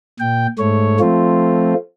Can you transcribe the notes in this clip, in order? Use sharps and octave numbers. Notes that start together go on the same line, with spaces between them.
A#2 G5
G#2 A3 C#5
F3 A3 C4 F4